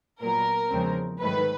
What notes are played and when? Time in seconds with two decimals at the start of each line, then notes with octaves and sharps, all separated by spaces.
0.22 A#2 F#3 B3 A#4
0.71 E2 C#3 F3 G#3 C4
1.20 G#2 D#3 F#3 A3 B4